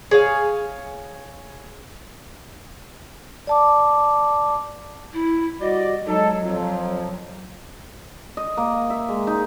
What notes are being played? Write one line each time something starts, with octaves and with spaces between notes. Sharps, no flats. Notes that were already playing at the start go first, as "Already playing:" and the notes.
G#4 C#5 F5
D5 A5 D6
E4
G3 F#4 D5 D#5
F#3 G#3 D#4 A4
F2 F3
D#5
A#3
E5
G#3
D#4